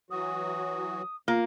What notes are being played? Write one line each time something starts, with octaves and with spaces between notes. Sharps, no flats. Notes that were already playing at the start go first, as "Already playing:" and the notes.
E3 F#3 F#4 D#6
E2 A#3 F4